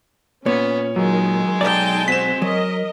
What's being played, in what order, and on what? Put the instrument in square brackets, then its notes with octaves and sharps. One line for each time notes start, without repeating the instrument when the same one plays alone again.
[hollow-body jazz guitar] A#2 [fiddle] B3 [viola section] C#4 [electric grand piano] C#5
[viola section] D#3 [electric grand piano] F#3 [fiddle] G#3
[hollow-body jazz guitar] B1 F#2 D5 [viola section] D#4 G5 A5
[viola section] C4 F#4 C5 [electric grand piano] B6 E7
[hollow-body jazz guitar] F#3 [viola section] A#4 D#5